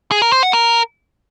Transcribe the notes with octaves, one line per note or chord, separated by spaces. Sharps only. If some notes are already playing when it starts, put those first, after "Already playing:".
G#4
A#4
C5
F#5
A#4